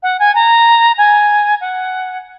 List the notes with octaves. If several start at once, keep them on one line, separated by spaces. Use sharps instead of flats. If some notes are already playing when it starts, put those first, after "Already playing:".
F#5
G#5
A#5
G#5
F#5